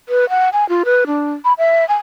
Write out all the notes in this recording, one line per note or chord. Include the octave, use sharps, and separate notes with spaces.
B4
F#5
G#5
F4
B4
D4
B5
E5
G#5